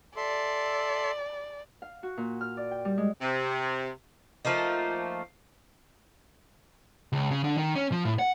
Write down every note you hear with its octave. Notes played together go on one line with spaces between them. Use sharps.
A4 D5 E5 C6
F5
F#4
A#2
F6
D5
G5
G3
G#3
C3
F3 A3 A#3 D#4
C#2
C#3
D3
D#3
C#4
F3
A2
F#5